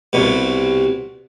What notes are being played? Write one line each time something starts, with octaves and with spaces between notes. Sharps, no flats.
C2 B2